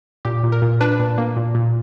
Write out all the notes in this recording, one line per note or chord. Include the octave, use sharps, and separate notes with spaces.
A#2 G4
A#2
A#4
A#2
D4 B4
A#2
A#3
A#2
A#2